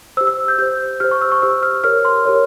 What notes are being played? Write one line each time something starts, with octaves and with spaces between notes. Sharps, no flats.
G4 C5 E6
E6
G6
G4 C5 G6
G4 C5 F6
C#6
E6
C#6
G4 C5 E6
F6
G4 A#4 C#5 F6
C6
G4 A#4 C#5